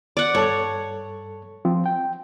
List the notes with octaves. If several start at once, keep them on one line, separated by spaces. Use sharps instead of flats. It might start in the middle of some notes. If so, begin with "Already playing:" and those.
D5 F#5
G2 A4 C#5 A5
F3 C4
G5